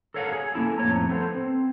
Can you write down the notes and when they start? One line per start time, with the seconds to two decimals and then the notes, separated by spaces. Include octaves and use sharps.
0.14 A4 A#4 C#5 F5 F#5
0.33 G#4
0.54 A#3 C#4 E4 A4
0.78 F2 A2 C#5 A#5
1.09 B3 A4 C5
1.35 C4